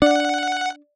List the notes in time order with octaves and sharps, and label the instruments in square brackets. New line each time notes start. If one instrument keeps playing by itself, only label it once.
[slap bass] D4 [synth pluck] D5 [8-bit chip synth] F#5